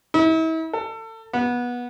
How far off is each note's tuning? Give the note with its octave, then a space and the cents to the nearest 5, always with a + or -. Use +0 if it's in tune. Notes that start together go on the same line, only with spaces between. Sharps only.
E4 -40
A4 +30
B3 -20